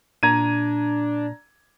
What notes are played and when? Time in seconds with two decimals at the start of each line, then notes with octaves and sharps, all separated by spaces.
0.23 A#2 D4 A#5 G#6 D#7